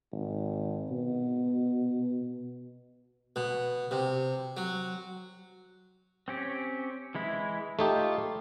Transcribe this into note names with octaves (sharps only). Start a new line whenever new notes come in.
G#1
B2
B2
C3
F#3
C4 C#4 G4
E3 G#3 E4
A3 D#4 F4 G4